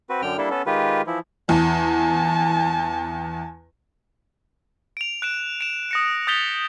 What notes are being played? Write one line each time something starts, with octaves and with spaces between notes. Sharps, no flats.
C4 F#4 B4
F#2 D3 G5 F6
G3 A#3 D4 E4 A4
B3 C#4 A4
D#3 G#3 F4 G4 B4
E3 F3 E4
E2 G#5 A5
D7 F7
F#6 D7 E7
D7 E7
D#6 A#6 C#7
D#6 G6 A6 B6 F7 G7